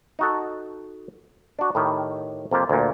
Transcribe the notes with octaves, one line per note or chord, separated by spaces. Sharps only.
D#4 F#4 A4
D4 F#4
A2 D#3 G4
F2 C3 A#3 F4 G4
D2 A#2